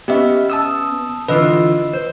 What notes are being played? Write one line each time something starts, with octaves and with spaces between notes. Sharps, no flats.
B3 C#4 G4 D#5 E5
A5 D#6 E6
D3 E3 F4 B4 D#5 E6
C5